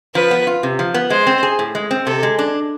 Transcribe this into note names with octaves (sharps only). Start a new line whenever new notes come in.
F3 B4
B3
F4
C3
F3
B3
G#3 C5
C4
G#4
A2
G#3
C4
C3 A4
G#3
D4